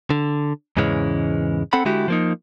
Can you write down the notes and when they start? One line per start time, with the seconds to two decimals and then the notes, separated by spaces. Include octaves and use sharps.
0.10 D3
0.77 E2 G#2 C#3 E3 G#3 C#4
1.73 C4 A4 F#5 B5
1.85 D3 G#3 E4 F#4 G4
2.08 F3 A#3 D#4